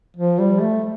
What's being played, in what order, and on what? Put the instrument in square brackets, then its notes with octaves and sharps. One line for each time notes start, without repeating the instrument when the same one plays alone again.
[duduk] F3
G3
A3